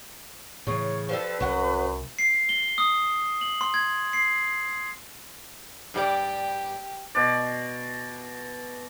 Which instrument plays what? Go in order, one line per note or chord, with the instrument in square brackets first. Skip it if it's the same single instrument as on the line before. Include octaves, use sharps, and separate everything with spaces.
[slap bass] A2 E3 [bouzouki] C#3 [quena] C#5
[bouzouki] F3 G3 A4 [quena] B4
[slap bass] C2 [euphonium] F#2 [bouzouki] F#3 F#5
[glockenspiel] C7
G7
D#6
F#7
C6
G#6
C7
[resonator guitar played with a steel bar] G2 G3 D5 [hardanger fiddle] G4
[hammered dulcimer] B2 D5